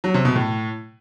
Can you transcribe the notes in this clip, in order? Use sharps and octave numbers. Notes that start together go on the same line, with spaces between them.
F#3
C3
B2
A2